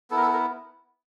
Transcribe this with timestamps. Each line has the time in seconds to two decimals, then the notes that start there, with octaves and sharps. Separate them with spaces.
0.10 B3 E4 A4
0.17 A#4
0.22 A4
0.33 A#4